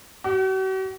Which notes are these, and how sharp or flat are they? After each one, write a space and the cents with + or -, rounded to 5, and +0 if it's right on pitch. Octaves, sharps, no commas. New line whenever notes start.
F#4 +45